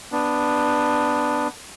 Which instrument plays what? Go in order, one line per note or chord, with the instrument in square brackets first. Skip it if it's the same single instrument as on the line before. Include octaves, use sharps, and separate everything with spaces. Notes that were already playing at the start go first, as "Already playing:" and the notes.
[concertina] B3 D4